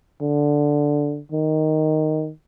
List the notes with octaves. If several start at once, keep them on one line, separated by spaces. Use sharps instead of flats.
D3
D#3